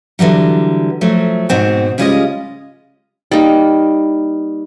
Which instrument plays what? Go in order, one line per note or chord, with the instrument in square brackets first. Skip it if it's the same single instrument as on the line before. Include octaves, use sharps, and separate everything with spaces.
[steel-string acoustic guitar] D3 E3 F#3 G3
F3 F#3 A3
G#2 B2 C4 F#4
C#3 G3 G#3 F4 D5 D#5
[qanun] G3 A#3 D#4